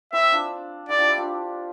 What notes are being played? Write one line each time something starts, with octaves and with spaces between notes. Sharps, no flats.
C4 E4 E5
D4 F4
E4 G4 D5
D4 F4
E4 G4
D4 F4